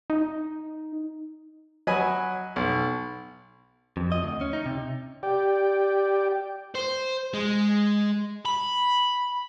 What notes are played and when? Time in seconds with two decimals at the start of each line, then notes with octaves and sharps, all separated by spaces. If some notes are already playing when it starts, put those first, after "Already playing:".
0.10 D#4
1.87 F#3 D#5 G#5 B5
2.56 B1
3.97 F2
4.12 D#5
4.23 D2
4.41 C#4
4.53 D#4
4.66 C3
5.23 G4 D5 G5
6.75 C5
7.34 G#3
8.45 B5